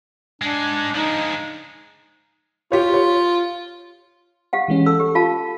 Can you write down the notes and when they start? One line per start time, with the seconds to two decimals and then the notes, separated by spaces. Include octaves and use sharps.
0.42 G#2 G#3 D4
0.95 F3 G#3 D#4
2.72 F4 G4 C#5
2.94 C#5
4.53 G4 F5 F#5
4.68 E3 G#3 C#4
4.86 A4 E6
5.00 G4
5.15 F4 F5 A5